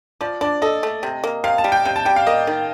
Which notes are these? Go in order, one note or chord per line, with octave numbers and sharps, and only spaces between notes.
F3 D5
D4 D5
A4 D#5
A3
C3
A#3
C3 F5
A5
G3
G5
C3 G5
A5
G3 G5
F5
A#3 D#5
D#3